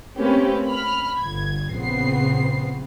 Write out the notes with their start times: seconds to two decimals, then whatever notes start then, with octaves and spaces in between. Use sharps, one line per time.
0.17 A3 A#3 C4 C#4 G4 B4
0.68 B5 F6
1.20 G1 G#6
1.71 A#1 C#3 B3 C4 C7